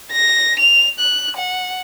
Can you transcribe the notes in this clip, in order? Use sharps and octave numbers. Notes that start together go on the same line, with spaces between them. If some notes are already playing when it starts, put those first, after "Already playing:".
A#6
F7
F#6
F#5